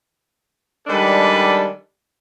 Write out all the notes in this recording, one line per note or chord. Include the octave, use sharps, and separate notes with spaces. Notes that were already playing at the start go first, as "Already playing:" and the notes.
D#3 G3 G#3 D4 A4 B4